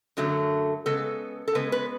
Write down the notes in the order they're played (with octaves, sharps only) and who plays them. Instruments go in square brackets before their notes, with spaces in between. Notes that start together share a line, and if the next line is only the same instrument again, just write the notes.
[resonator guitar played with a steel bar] F#2 D3 F#3 A3
C#3 G#3 B3 A4
A4
C#3 G#3 B3 B4
B4